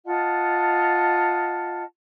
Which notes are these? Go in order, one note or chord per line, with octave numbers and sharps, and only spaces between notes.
F4 D#5 F#5 A5